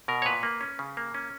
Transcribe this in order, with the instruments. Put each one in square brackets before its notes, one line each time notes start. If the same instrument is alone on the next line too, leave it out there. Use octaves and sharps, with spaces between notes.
[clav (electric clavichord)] B2 A#4
C#5
A#2 B4
A#3
C#4
C#3
A#3
C#4